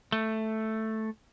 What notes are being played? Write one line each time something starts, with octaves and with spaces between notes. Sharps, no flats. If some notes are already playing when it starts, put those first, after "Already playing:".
A3